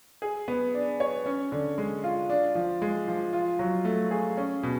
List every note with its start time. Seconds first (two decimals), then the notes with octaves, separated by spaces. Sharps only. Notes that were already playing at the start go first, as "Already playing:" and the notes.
0.22 G#4
0.48 B3
0.74 D4
1.00 C#5
1.26 C#4
1.52 D3
1.78 G#3
2.04 F4
2.30 D4
2.55 F3
2.82 G#3
3.08 F3
3.33 F4
3.59 F#3
3.85 A3
4.11 G#4
4.37 C#4
4.63 B2